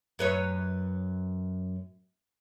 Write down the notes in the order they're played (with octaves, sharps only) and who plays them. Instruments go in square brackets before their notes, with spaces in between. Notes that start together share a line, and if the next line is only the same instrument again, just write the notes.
[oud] F#2 B4 C#5